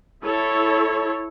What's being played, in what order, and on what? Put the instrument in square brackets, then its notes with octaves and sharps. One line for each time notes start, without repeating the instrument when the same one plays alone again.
[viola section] E4 A4 C#5